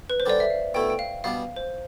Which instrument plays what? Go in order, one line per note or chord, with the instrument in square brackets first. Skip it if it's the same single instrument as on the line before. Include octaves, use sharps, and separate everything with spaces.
[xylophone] B4
C5
[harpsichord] D3 G3 D4 [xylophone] D5
[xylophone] E5
F5
[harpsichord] B2 A3 E4 [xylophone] G5
[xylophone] G5
F5
[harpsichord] B2 G3 B3 D4 [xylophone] F5
[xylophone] C5